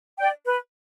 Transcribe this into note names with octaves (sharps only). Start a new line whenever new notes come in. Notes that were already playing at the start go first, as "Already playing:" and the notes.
D5 G5
B4